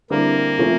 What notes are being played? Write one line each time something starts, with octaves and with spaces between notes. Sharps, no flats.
D3 G3 A#3 C4 E4 G4
C3 F3 A3 C#4